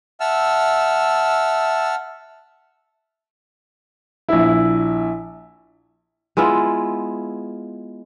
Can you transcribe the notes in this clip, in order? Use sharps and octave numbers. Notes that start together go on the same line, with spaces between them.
E5 F#5 A5 E6 F6
A#1 E4
G#3 B3 E4 F4